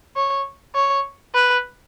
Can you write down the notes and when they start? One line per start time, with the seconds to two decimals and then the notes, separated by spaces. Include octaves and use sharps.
0.16 C#5
0.75 C#5
1.35 B4